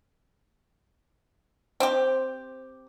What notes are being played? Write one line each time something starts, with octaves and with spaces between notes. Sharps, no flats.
C4 G4